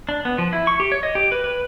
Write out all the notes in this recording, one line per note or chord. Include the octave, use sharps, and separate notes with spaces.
D4
B3
F3
E4
C#6
G4
C#5
D#5
G4
B4
B4